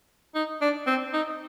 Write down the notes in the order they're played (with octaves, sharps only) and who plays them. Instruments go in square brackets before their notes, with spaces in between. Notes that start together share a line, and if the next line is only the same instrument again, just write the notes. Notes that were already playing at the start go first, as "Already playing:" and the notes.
[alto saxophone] D#4
D4
C4
D#4